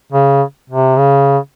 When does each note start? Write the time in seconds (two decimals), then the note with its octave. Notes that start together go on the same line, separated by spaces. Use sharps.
0.12 C#3
0.70 C3
0.98 C#3